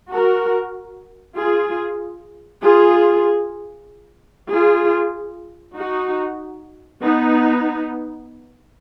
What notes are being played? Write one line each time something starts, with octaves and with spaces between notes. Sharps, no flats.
F#4 A#4
F4 G#4
F4 G#4
F4 G#4
D#4 F#4
B3 D#4